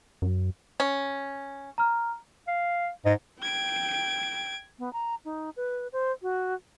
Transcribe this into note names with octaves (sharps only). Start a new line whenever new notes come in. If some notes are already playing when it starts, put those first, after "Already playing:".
F#2
C#4
A#5 F6
F5
G#2 D#5
G5 G#6 D7
B3
A#5
D#4
B4
C5
F#4